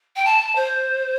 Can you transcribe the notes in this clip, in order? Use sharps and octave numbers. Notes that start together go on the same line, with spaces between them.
G5
A5
C5